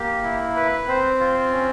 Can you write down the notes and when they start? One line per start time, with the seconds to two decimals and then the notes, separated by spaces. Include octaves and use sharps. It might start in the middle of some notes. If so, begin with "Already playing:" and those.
Already playing: A#3 G4
0.23 E4
0.56 B4
0.87 C4 C5
1.20 F4
1.52 C#4